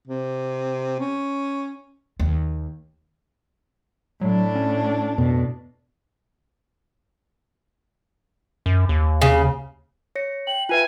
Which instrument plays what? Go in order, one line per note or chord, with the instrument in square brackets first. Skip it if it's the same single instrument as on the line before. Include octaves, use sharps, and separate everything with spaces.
[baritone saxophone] C3
C#4
[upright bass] D#2
[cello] A2 D4 [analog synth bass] F#3
[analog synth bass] C#4
[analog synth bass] F2 [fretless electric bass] B2
[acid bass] F#2
D#2
[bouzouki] C#3
[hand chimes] C#5 A#6 C#7
[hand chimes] G5 [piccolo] F#7
[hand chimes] F4 B4 E5 [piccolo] G#5